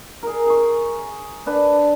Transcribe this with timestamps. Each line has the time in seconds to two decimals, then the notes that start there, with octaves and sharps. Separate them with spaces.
0.23 G#4 A#4
0.46 G#4 C#6
1.46 D4 B4 A5